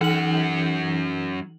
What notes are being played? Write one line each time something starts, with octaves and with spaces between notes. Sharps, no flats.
F#2 E3 D#4 F#5 F#7